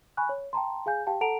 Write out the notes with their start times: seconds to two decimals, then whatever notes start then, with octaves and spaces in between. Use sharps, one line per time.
0.17 G#5 B5 C#6 F#6
0.29 C#5
0.53 G5 A5 A#5 C6
0.86 G#4 F5 G#5 G6
1.07 G4 F5 G5 A5
1.21 A4 F#5 A5 A#5 D7 F7